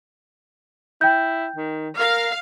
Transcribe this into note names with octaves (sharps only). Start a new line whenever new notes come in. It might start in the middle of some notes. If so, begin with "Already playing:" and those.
E4 G5 G6
D#3
A#4 F5